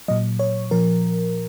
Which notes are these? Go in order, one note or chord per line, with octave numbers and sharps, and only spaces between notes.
A#2 F#3 D#5
C#5
A#2 F3 A#4